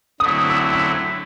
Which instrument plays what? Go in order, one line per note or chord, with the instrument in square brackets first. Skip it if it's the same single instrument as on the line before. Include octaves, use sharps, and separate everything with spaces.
[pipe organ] D3 F#3 A3 C4 E4 [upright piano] D#6
[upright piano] E6
E6